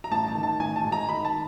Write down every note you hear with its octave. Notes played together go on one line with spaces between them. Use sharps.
A#5
A1 A5
A5
D#3
A5
A1 G#5
A5
G#2
A#5
D#3 B5
A5